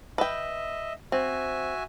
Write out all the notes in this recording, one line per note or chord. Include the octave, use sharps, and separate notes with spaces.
B4 D#5 E5 G5
C4 F#4 E5 G#5